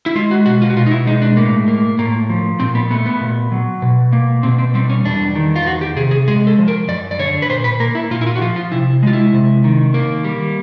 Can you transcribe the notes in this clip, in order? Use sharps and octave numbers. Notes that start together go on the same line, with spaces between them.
E4
G#3 F4
F#4
B2 F#4
F4
F#4
B2 F4
D#4
E4
G#3 D#4
D4
A2 A#3
A#3
A2 A#3
F3
A#2 C4
B3
A3 B3
B3
A#2
F#3
B2
A#3
B2 C4
C4
G3 C4
C#4
E2 D4
D#3
F4
E2 F#4
G4
C3 G#4
G#4
G#3 G#4
A4
F3
A#4
F#2 D5
D5
D3 C#5
B4
A#2 C5
B4
A#3 A#4
E4
A#2 F4
E4
F4
F#4
F3 F4
F4
C3 E4
G#3 F4
E4
C3
D#3
A#3
G3